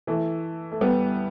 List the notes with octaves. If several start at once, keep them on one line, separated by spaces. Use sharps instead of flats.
E3 A3
A3
G3 B3